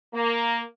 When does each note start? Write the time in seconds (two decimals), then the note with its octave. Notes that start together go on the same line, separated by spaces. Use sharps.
0.13 A#3